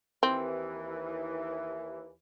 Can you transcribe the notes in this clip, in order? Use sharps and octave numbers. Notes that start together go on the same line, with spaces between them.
D#2 E3 C4